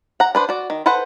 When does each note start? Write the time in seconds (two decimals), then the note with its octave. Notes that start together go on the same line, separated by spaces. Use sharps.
0.20 F#5 A#5
0.35 D4 B4 C5
0.49 F#4 D5
0.70 D#3
0.86 A4 B4 C5 F#5